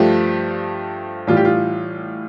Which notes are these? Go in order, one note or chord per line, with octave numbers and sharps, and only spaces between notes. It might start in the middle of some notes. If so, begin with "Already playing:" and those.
Already playing: G2 F3 A3 G4
A2 E3 G3 F4
G4
F4